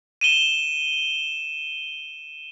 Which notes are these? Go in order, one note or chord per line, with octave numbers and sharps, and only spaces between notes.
D#7 E7 G7